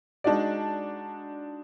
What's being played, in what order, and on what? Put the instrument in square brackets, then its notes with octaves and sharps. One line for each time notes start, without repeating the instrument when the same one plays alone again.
[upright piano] G#3 D4 D#4 F#4 D5